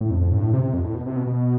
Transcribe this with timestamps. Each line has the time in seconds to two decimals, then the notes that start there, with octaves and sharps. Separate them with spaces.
0.01 A2
0.11 F2
0.21 F2
0.32 A2
0.37 G2
0.43 A2
0.53 C3
0.64 C3
0.74 F2
0.84 A2
0.95 B2
1.06 C3
1.16 B2
1.27 B2